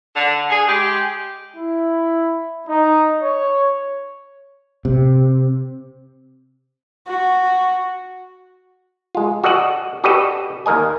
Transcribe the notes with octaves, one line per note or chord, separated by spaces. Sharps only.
D3
G#4
G#3 G4
E4
D#4
C#5
C3
F#4
G#3 F4
F#4 A4 D5 D#5 F#5
F#4 G4 A4 B4 D5 D#5
D#2 A#3 A#4 D#5 G#5